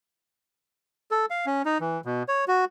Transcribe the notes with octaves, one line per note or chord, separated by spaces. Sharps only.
A4
F5
C#4
D#4
E3
B2
C#5
F#4